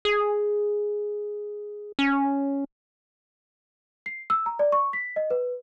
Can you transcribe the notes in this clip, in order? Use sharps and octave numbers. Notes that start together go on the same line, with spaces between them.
G#4
C#4
C7
E6
A#5
D5
C#6
B6
D#5
B4